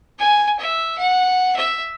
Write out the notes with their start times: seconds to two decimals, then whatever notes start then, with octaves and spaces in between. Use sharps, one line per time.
0.19 G#5
0.59 E5
0.98 F#5
1.56 E5